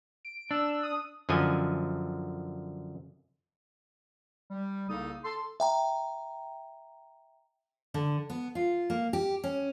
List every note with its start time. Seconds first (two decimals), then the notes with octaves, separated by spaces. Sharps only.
0.25 D7
0.51 D4 E6
0.83 D#6
1.29 F#2 D3 F3 D#5 G#5
4.51 G3
4.89 C2 C#3 A#3 D#4 A4 D#6
5.24 A4 C6
5.60 E5 G5 A#5
7.94 D3
8.30 B3
8.55 F4
8.90 A#3
9.13 G4
9.44 C#4